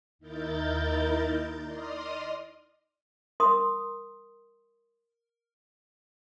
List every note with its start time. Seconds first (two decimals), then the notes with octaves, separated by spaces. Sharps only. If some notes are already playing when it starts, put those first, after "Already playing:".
0.19 D#2 D#4 E4 A#4 G6 A6
1.63 D5 D#5 C6 D#6 F6
3.40 A#4 C6 D#6